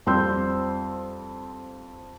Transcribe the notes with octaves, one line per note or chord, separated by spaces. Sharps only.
F2 G3 C4 C6 E6 G6